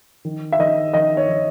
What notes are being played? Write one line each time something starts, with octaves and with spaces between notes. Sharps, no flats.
D#3
E5
D#3 D#5
D#3 D#5
C#5
D#3